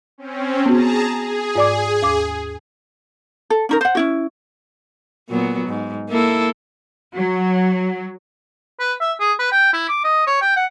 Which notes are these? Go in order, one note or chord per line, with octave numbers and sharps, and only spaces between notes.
C4 C#4
B3 F#4 G#4 A5 A#5
G#4
G#2 D5 D6
D#2 D6
A4
C#4 D#4 A#4
C5 F#5
C#4 E4 F#4
A#2 F#3 B3
G#2
A#3 E4 A4
F#3
B4
E5
G#4
B4
G5
E4
D6
D#5
C#5
G5
F#5